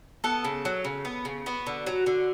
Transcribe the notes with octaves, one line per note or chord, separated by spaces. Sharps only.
B3 A4
C#3
F#3
C#3
B3
C#3
B3 F#4
D3
F#3
D3